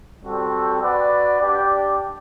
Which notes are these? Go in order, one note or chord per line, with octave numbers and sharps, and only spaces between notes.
G3 C4 F#4 A4
F#4 B4 D5
D4 G4 D5 G5